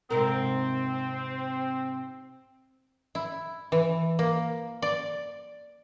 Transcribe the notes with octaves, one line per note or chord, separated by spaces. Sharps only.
G#2 C3 C4 A#4
E4
E3
A#3
D5